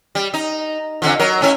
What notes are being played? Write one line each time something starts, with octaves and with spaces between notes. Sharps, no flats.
G3
D#4
F2 D3 F3
F#3 A#4
A2 C#4 E4